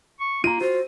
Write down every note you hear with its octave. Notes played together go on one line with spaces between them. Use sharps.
C#6
A#3 F4 A#5 D#7
F4 F#4 C5